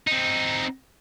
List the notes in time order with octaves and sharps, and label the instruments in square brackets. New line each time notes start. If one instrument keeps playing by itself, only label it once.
[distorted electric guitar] C4 D#4